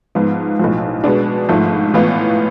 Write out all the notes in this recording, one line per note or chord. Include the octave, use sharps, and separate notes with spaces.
G#2 F3 B3 F4
B1 A2 F3
B2 G#3 B3 D4
G#1 G#2 F3 A3
A1 A2 E3 B3 F4